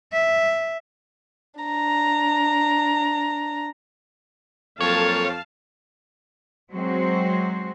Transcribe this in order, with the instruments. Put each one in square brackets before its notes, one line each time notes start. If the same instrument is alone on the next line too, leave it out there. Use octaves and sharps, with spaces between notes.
[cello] E5
[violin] D4 A#5
[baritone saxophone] F2 [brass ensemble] F#3 A#3 A4 [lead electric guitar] C#5 [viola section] F5 A5
[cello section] F#3 G#3 C4 F#4 C5